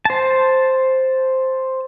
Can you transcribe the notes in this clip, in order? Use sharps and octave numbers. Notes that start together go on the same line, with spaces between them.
C5 A5